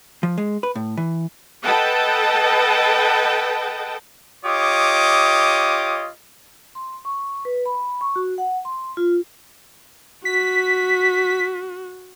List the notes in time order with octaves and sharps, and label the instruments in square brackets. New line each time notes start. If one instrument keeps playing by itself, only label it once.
[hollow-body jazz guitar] F3
G#3
B4
A2
E3
[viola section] A4 B4 D#5 F#5 G5 A5
[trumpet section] F4 G4 C#5 D#5 D6 D#6
[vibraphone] C6
C#6
B4
B5
C#6
F#4
F#5
C6
F4
[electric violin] F#4 [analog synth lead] B6